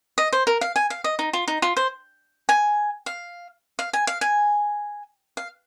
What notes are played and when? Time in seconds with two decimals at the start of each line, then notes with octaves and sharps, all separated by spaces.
0.18 D#5
0.33 C5
0.47 A#4
0.61 F5
0.76 G#5
0.90 F5
1.04 D#5
1.19 D#4
1.33 F4
1.48 D#4
1.62 F4
1.77 C5
2.49 G#5
3.06 F5
3.79 F5
3.93 G#5
4.07 F5
4.21 G#5
5.37 F5